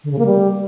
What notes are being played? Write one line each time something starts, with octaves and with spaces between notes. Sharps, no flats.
D3
C#3
A#3
G3